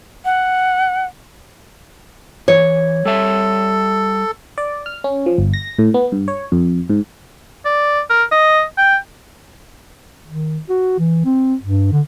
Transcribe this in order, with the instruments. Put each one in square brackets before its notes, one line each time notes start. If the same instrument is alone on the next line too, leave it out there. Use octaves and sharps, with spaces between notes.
[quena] F#5
[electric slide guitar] E3 [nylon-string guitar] C#5
[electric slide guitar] G3 E5 [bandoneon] A4
[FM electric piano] D5
F6
C#4
F3
G1
A#6
A2
B3
G2
C#5
F2
G#2
[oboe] D5
A#4
D#5
G5
[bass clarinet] D#3
F#4
E3
C4
G2
D3